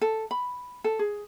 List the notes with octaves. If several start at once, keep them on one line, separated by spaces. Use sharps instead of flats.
A4
B5
A4
G#4